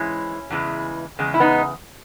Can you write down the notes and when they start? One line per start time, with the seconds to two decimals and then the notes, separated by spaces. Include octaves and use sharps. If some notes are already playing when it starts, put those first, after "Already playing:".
Already playing: G#2 E3 G#3 C#4 E4
0.50 E2 C#3 E3 G#3
1.19 E2 C#3 G#3
1.34 E4
1.40 B3 D#4